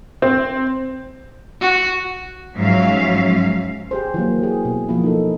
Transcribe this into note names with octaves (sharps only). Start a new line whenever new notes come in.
C4
F#4
G#2 F3 F#3 C#4 E5 F5
G4 G#4 C5
E3 F#3 A#3
G4 G#4
B2
F3 A#3 E4
D#4 A4